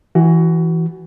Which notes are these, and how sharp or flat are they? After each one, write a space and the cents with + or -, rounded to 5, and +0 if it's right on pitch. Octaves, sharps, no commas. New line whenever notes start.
E3 +0 F#4 +20